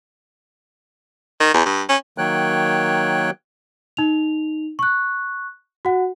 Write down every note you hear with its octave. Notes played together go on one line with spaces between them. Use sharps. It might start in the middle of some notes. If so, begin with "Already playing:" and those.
D#3
E2
G2
C#4
D#3 F#3 A#3 C#5 G5 F#6
D#4 F7
C#6 F#6
F#4 F#5